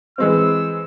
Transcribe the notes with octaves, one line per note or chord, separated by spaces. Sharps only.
E3 G#3 C4 E6